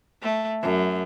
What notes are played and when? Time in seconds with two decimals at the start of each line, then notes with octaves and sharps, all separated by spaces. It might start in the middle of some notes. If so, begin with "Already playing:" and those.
0.22 A3
0.62 F#2